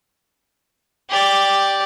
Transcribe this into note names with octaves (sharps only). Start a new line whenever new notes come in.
G4 D5